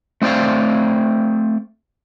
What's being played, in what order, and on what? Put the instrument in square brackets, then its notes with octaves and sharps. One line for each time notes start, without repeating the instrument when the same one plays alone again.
[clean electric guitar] A3 C4 C5 D5 F5